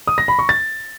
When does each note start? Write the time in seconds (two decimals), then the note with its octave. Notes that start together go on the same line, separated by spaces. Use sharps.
0.07 D#6
0.18 A#6
0.28 B5
0.39 C#6
0.49 A6